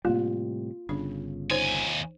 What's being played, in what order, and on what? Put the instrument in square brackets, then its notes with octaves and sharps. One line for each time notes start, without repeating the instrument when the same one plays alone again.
[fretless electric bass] A2 C3 G3 [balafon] A#3 [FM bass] F4
[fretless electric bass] G1 C#3 [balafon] D4
[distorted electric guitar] D#2 G#5 [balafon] D#4 C5 C#5